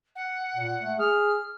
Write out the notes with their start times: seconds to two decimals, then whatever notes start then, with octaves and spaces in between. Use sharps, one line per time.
0.15 F#5
0.55 A#2
0.81 A3
0.99 G#4 F6